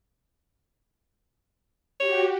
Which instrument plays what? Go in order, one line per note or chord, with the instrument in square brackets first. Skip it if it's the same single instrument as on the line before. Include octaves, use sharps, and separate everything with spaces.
[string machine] F#4 G4 [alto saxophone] C#5